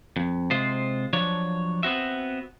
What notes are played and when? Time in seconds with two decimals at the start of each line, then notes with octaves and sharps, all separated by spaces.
0.17 F2
0.51 C3 G#3 F4 C5
1.13 F3 F#3 D4 C#5
1.83 B3 C4 F#4 E5